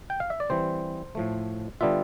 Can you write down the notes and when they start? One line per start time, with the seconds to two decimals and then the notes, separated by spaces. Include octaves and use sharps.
0.10 G5
0.20 F5
0.30 E5
0.40 D5
0.50 E3 G3 C4 C5
1.15 A2 F3 A3
1.81 D3 G3 B3 D4 F4 E5